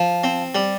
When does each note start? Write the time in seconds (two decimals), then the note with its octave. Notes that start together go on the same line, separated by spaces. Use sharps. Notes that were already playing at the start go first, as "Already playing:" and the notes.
Already playing: F3
0.24 C4
0.55 G3